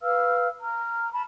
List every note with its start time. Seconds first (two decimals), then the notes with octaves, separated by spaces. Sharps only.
0.01 B4 F5 E6 F6
0.60 A#5 F6
1.13 A5 B5